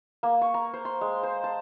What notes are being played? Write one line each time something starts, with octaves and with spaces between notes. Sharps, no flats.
A#3
C#6
A#5
C5
C6
G#3
C5
A5